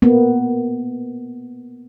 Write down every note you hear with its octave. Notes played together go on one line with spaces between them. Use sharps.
A#3 B3